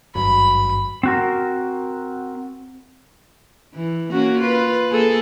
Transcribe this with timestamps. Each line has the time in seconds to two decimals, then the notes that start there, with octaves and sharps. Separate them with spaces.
0.15 G#1 G2 F#3 B5
1.03 C4 F#4 A#4
3.74 E3
4.11 A#3 C#4 F#4
4.40 F4 B4
4.91 A#3 G#4 A4